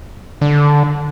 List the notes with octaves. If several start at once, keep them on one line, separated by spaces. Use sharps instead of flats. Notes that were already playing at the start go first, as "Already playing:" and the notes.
D3